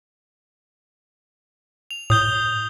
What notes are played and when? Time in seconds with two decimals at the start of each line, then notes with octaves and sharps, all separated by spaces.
1.91 F7
2.10 A2 D#6 G6 G7